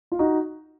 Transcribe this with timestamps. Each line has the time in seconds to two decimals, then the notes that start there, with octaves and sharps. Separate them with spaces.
0.12 F4
0.19 D#4 F#4